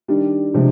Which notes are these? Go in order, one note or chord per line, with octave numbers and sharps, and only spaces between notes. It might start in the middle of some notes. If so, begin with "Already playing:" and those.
D#3 G3 D4
C3 F3 G#3 D4